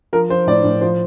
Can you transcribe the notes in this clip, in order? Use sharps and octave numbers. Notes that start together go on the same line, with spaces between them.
F3 A#4
F3 C5
A2 D5
A2
F3 C5